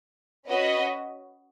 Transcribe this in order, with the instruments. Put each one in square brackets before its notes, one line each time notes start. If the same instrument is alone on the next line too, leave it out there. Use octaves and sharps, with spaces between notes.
[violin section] C#4 F#4 B4 D#5